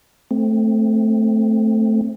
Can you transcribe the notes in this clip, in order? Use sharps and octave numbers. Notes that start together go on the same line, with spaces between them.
A3 C4